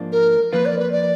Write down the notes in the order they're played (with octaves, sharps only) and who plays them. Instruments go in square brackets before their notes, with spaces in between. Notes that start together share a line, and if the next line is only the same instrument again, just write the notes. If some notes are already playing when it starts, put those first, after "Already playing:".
Already playing: [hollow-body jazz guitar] G#2 F3 A#3 D4
[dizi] A#4
[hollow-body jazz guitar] F2 F3 A#3 F4 [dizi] B4
[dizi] D5
B4
D5